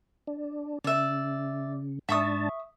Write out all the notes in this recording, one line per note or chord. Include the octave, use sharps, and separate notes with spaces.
D4
C#3 D5 E5
G#2 D4 E5 A5 C#6 D#6